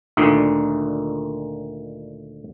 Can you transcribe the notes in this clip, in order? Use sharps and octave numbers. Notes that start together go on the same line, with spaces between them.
D2 A#2 D3 D#3